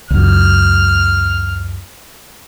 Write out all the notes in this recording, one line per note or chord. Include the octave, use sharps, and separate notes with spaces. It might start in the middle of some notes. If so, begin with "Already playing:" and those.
C#2 F#2 F6